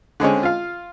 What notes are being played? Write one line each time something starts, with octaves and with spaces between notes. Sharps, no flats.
D3 G#3 C4 C#4
F4 F5